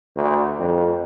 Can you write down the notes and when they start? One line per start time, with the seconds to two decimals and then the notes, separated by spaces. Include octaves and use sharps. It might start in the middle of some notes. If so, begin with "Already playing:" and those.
0.16 D2
0.59 F2